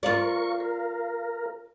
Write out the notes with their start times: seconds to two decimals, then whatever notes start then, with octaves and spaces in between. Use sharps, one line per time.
0.03 F4 A#4 D5 F5 C#6
0.60 A#4